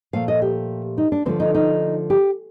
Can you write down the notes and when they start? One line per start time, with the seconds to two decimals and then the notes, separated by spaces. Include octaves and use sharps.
0.13 A#2 F3 A3 F5
0.28 D#5
0.42 G4
0.98 D#4
1.12 D4
1.25 D3 F3 A3 C4
1.40 D#4
1.54 D#4
2.10 G4